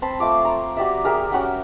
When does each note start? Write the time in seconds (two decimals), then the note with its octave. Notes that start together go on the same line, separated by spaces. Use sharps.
0.02 C4 A5 B5 C6
0.20 A3 F4 D6
0.45 A#5
0.77 F#4 G4 D5 E5
1.04 G4 G#4 A#4 E5
1.32 C#4 F#4 F#5 G5